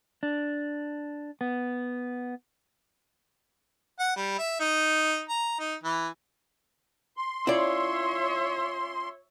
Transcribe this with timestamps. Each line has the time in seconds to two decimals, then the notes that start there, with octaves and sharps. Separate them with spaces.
0.23 D4
1.41 B3
3.99 F#5
4.16 G3
4.39 E5
4.60 D#4
5.29 A#5
5.59 D#4
5.83 E3
7.17 C6
7.47 C#4 E4 F4 C#5 D5 E5